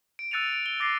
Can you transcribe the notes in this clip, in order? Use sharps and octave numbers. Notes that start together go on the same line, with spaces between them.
D7
E6 F#6 A6 C#7 D#7 F7
D7
G7
D6 A6 A#6 C7